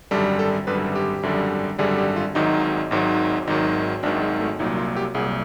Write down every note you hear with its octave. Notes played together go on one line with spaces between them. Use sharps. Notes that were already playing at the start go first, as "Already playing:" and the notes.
G#1 F#2 D3 G3 A4
A4
G#1 F#2 D3 G3 B4
G4
G#1 F#2 D3 G3
G#1 F#2 D3 G3 G#4
G4
F4
G#1 G#2 D#3 F#3 D#4
G#1 G#2 D#3 F#3
G#1 G#2 D#3 F#3 D#4
G#1 G#2 D#3 F#3 D4
G#3
A3
C2 A#2 F#3 D#4
F4
G4
C2 A#2 F#3 G#4